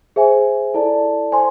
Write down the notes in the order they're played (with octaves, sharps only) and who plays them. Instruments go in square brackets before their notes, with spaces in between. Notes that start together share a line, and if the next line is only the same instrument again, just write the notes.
[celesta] G#4 C5 E5 G#5
E4 A4 D5 A5
C5 G#5 C6